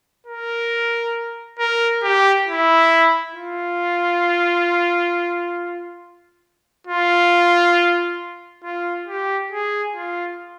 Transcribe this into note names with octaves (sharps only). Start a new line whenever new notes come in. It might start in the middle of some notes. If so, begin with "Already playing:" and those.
A#4
A#4
G4
E4
F4
F4
F4
G4
G#4
F4